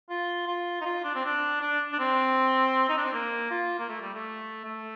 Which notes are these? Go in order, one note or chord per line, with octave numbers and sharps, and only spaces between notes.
F4
F4
D#4
F4
D4
C4
D4
D4
D4
C4
D#4
D4
C4
A#3
F4
A#3
A3
G3
A3
A3